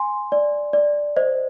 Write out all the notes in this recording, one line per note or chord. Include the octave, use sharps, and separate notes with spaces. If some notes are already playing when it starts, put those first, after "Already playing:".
Already playing: G#5 C6
D5
D5
C5 D#5